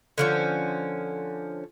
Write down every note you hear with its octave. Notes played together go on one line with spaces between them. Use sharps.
D3 F3 C#4